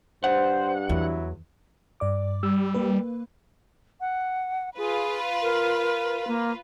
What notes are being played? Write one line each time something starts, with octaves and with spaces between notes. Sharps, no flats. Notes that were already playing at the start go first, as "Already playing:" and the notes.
G2 C5 F#5
E2 F#3 E4
G2 D5 D6
G3 E6
A#3 B4
F#5
F4 G#4 B4
A#4
A#3